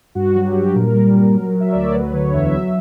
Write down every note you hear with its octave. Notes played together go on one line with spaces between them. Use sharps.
G2 F#4
F#3
G4
G2
A#2 A#4
G3
G3
F#3
F#3
E5
D2 D5
C#5
F#3 B4
D3 C#5
E2 E5
F#3